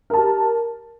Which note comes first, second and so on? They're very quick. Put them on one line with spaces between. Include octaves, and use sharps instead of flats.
A#4 A5 G4